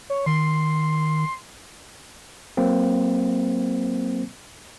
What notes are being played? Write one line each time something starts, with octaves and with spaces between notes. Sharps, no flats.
C#5
D#3 C6
F#3 A#3 C4